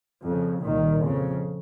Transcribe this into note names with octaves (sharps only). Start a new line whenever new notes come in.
F2 C#3
C2 A#2 D#3
F2 C#3